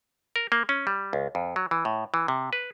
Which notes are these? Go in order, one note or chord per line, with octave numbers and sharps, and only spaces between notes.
A#4
A#3
C#4
G3
C#2
F2
F#3
E3
A2
E3
C3
B4